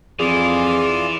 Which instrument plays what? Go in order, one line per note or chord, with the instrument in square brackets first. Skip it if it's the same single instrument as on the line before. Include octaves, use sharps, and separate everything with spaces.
[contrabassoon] F2 [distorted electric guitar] E3 [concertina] F4 D5 F5 [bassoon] G#4